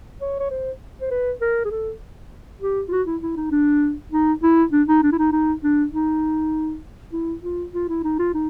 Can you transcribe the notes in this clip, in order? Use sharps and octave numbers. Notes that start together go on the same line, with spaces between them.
C#5
C#5
C5
C5
B4
A#4
G#4
A4
G4
F4
F#4
E4
E4
D#4
D4
D#4
E4
D4
D#4
D4
E4
D#4
D#4
D4
D#4
E4
F4
F4
E4
D#4
F4
D#4